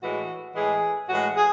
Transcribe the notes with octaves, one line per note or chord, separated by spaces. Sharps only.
A2 E3 G#3 F#4
A2 E3 G#3 G#4
A2 E3 G#3 F#4
G#4